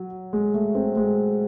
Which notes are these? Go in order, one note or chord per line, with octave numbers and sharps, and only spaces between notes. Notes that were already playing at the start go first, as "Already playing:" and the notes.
Already playing: F#3
G#3
A3
C4
G#3